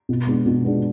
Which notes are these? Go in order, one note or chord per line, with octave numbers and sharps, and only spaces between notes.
B2
G#3 B3 D4
B2
G#3 B3 D4